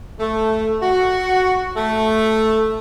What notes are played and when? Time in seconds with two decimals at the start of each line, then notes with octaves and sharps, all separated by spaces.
0.19 A3
0.82 F#4
1.77 A3